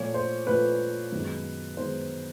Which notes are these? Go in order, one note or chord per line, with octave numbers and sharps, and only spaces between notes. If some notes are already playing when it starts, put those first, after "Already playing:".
Already playing: A#2 F3 A3 C#5
C5
A#2 F3 A3 B4
F#2 D#3 G#3 B3 D#4
D#3 G#3 B3 D#4 C5